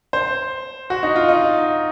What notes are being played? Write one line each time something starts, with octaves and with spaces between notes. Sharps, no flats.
C5
F#4
D#4
F4
D#4